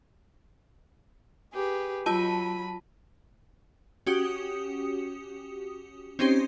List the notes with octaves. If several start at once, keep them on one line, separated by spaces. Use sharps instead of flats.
G4 G#4 B4
F#3 F4 A5 B5 D#7
C#4 F#4 G4 D#6 C#7
C4 C#4 D#4 G4 C5